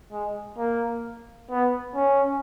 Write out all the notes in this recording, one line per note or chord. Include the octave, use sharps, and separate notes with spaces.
G#3
A#3
B3
C#4